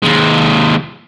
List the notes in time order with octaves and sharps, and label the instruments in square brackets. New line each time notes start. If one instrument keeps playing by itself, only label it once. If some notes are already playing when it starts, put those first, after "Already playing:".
[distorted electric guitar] D#2 G#3